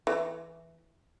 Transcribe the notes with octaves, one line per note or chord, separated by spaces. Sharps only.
E3